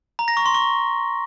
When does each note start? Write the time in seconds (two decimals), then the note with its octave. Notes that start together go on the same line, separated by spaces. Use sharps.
0.19 A#5
0.28 A#6
0.37 C#6
0.46 C6
0.54 C#6